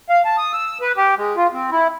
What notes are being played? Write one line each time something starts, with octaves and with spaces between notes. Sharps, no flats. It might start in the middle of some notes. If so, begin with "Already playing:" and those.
F5
A5
D#6
E6
B4
G4
G#3
F4
C4
E4